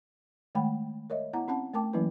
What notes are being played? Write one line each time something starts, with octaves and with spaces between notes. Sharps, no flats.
D#3 G#3 A3 F#5 G5 B5
A#4 C#5 D#5 E5
B3 E4 F#5 A#5
C4 C#4 F#5 A5
A3 A#4 G5 A5 D6
E3 F#3 A#3 C#4 E4 B4